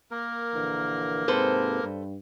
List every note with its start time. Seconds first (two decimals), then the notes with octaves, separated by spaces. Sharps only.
0.11 A#3 A#4
0.55 A#1 D3 E3
1.28 G#2 C3 C4 A4 B4 C5
1.83 G2